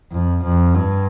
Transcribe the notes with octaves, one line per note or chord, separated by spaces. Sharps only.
F2
F2
G2